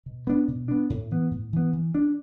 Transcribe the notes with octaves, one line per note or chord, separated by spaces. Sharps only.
B2
B3 D4
B2
B3 D4
A2
E3 B3
A2
E3 B3
E3
D4